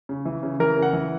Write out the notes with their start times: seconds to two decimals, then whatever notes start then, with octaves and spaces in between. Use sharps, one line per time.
0.09 C#3
0.25 E3
0.43 C#3
0.60 E3 A#4
0.77 C#3
0.82 F#5
0.93 E3